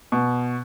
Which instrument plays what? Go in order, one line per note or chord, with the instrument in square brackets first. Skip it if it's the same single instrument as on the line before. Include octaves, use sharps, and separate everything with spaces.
[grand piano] B2